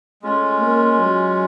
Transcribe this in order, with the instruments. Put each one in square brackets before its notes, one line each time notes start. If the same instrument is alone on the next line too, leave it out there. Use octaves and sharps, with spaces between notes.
[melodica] G#3 C#4 F4 [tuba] A3
[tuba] A#3
F#3